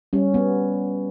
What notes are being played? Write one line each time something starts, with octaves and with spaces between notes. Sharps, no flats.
G3 C#4
B3